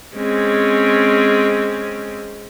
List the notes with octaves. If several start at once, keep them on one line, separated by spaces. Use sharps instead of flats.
G#3 C4 C#4